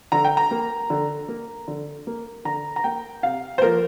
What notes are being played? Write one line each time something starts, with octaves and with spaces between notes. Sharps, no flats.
D3 A#5
G5
A#5
A#3
D3
A#3
D3
A#3
D3 A#5
A#5
A#3 G5
C3 F5
C5
F3 A#3 A#4